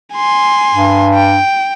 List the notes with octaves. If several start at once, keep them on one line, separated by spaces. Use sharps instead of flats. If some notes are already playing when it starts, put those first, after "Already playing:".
G#5 C6
G2
G5